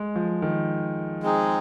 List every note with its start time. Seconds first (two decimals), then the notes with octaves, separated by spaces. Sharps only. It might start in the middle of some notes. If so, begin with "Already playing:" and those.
Already playing: G#3
0.16 F3
0.42 D#3
1.23 G#3 C4 D#4 G#4